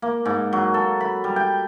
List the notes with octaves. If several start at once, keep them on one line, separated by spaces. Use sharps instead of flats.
A#3
G#2
F#3
A4
B5
G3
G5